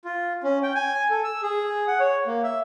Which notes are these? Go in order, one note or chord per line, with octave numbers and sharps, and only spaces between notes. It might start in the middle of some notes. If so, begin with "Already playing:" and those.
F4
C#4
G5
G#5
A4
E6
G#4
F#5
C#5
A#3
E5